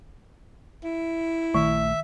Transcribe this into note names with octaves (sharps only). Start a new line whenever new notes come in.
E4
A#1 D#3 A3 E5